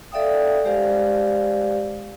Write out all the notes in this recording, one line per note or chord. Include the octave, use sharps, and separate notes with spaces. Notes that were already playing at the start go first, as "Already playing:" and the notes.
A4 D5 E5 F5 G5 D#6
G#3 G4 C5 D5 F5